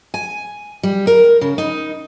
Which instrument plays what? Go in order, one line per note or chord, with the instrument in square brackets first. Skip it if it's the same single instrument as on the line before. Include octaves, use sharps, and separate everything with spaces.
[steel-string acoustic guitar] G#5
G3
A#4
C#3
D#4